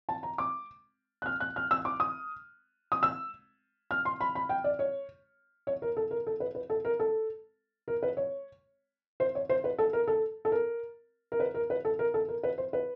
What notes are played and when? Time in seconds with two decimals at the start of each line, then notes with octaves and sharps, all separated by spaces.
0.09 A5
0.23 A#5
0.38 D6
1.22 F#6
1.26 F6
1.40 F#6
1.56 F6
1.71 E6
1.85 D6
2.00 D#6
2.92 D#6
3.03 E6
3.91 F6
4.05 C6
4.21 B5
4.35 B5
4.49 G5
4.64 D5
4.79 C#5
5.67 C#5
5.82 A#4
5.97 A4
6.11 A#4
6.27 A4
6.40 B4
6.55 B4
6.70 A4
6.85 A#4
7.00 A4
7.88 A#4
8.03 B4
8.17 C#5
9.20 C5
9.35 C#5
9.49 C5
9.64 B4
9.79 A4
9.93 A#4
10.07 A4
10.45 A4
10.52 A#4
11.32 A#4
11.40 B4
11.54 A#4
11.70 B4
11.85 A4
11.99 A#4
12.14 A4
12.28 A#4
12.43 B4
12.58 C5
12.73 B4